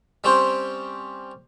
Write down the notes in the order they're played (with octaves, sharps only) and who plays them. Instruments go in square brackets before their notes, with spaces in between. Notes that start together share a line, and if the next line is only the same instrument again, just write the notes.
[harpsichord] G3 C4 C#4 G4 C5